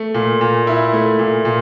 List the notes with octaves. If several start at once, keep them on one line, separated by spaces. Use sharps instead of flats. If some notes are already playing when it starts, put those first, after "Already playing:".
Already playing: A3
A#2
A#2
E4
A3
A#2
A#2